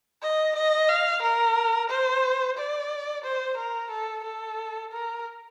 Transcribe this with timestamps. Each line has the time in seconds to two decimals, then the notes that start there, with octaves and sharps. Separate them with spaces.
0.22 D#5
0.56 D#5
0.89 F5
1.22 A#4
1.90 C5
2.57 D5
3.24 C5
3.57 A#4
3.90 A4
4.24 A4
4.92 A#4